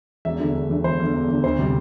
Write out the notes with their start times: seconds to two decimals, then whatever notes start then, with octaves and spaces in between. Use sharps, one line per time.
0.25 E1 E5
0.40 E2 D3
0.55 E1
0.70 E2 D3
0.84 E1 C5
1.00 E2 D3
1.14 E1
1.28 E2 D3
1.44 D2 C5
1.59 C3 G3